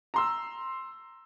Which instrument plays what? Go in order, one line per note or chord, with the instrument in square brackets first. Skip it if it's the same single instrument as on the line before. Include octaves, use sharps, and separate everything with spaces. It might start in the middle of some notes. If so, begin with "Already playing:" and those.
[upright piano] A#5 C6 E6